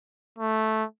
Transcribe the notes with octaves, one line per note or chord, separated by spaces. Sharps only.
A3